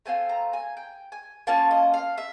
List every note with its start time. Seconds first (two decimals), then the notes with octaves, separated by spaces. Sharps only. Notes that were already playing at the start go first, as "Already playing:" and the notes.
0.06 A3 C4 F4 G#5
0.29 A#5
0.53 G#5
0.77 G5
1.12 G#5
1.47 A#3 C#4 F4 A5
1.71 D#5
1.94 F5
2.18 E5